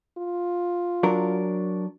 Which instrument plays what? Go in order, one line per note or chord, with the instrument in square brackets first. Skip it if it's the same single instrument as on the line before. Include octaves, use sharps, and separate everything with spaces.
[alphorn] F4
[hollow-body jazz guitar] F#3 D4 A#4